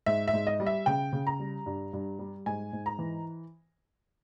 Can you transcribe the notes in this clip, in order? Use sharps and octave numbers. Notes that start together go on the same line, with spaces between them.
G#2 E5
E5
G#2
D#5
G3
E5
C#3 G5
C#3
A#5
G3
G2
G2
G3
G#2 G#5
G#2
A#5
E3